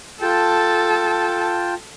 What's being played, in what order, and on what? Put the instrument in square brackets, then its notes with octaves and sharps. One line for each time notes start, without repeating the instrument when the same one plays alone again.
[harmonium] F4 G5 A5 [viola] A4